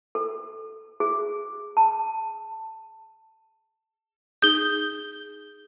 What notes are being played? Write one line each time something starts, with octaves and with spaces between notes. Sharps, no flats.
A4
G#4
A5
D#4 G#4 D#6 G6 G7